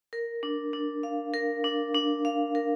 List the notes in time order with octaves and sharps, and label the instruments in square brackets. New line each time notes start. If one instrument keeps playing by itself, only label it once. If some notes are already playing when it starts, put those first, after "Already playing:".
[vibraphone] A#4
D4
D4
F5
A#4
D4
D4
F5
A#4